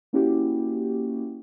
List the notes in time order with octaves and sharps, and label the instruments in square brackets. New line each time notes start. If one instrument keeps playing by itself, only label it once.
[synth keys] A#3 C#4 E4 F#4 G4